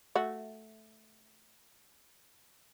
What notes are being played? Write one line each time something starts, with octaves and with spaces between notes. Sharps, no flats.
A3 F#4